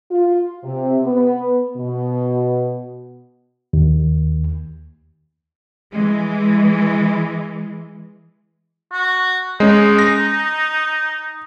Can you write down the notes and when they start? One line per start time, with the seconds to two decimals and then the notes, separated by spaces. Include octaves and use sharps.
0.11 F4
0.63 C3
1.03 B3
1.76 B2
3.73 D#2
5.92 E3 G#3
8.92 F#4
9.60 G#3 C#4 D#4
9.99 A#6